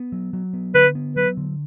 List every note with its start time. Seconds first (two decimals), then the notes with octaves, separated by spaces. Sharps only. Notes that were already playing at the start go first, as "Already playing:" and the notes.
Already playing: B3
0.12 F#3
0.33 F#3
0.53 B3
0.74 D3 B4
0.95 B3
1.16 F#3 B4
1.37 D3